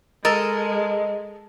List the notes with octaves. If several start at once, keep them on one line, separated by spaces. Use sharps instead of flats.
G#3 A4 A#4 D#5